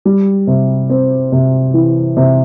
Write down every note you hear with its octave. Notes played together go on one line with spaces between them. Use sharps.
G3
C3
C4
C3
E3
C3